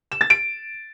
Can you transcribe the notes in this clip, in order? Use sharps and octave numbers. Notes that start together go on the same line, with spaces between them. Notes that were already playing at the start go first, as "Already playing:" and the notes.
E7
A6
D7